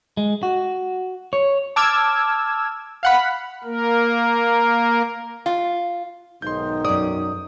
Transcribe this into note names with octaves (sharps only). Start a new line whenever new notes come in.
G#3
F#4
C#5
A5 D6 E6 F6 G#6
F5 F#5 B5
A#3 A#4
F4
B1 G#2 D#3 D#4 C6 G6
F#2 D5 D#6